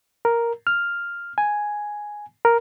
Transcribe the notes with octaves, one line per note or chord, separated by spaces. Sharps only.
A#4
F6
G#5
A#4